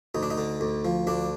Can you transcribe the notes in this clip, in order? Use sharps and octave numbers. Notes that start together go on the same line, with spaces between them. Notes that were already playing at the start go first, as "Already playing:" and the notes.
D2 D#4
D4
D#4
D3
D2
F3
D2 D4